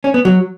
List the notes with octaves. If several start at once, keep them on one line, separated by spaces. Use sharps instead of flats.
C#4
B3
F#3